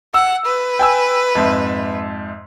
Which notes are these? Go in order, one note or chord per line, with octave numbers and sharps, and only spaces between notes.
F#5 E6
B4
G5 G#5 E6
F2 G#2 E5